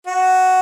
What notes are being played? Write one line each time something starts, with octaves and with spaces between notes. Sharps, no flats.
F#4